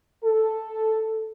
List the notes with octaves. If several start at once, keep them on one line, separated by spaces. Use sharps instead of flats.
A4